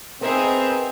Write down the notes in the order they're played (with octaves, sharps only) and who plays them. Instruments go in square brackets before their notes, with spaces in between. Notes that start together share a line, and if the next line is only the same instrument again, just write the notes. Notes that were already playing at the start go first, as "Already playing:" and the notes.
[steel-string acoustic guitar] B3 A#4 [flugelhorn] C4 [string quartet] D#4 G#4 E5